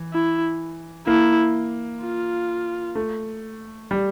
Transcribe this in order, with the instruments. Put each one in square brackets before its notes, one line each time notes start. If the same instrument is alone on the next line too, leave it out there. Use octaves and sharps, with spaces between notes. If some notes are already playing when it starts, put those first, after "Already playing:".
Already playing: [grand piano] E3
[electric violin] E4
[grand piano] A#3 [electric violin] E4
[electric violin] F4
[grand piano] A3
G3